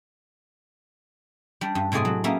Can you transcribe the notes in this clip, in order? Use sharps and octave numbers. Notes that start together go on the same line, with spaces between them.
G3 D4
G2
A2 C3 G#3 G#4 D5 G#5
F#3
A#3 B3 C#4 A#4 E5